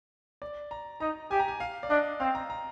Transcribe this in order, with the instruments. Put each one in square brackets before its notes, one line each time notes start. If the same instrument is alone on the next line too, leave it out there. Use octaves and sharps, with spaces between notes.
[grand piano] D5
A#5
[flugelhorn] D#4 [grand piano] A#5
[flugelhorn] G4 [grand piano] G#5
[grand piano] A#5
G#5
F5
D5
[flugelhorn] D4 [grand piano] D#5
[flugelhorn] C4 [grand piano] F5
[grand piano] A#5
A#5